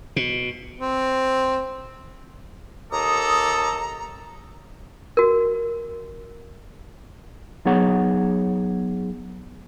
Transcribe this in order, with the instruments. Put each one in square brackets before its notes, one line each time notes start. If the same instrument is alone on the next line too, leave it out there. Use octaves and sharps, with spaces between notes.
[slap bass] B2
[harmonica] C4
[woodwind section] D#2 D6 D#6 [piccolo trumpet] A4 [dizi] A#5
[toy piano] F#4 A#4
[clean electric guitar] F#3 B3 D#4 G#4 C#5 F#5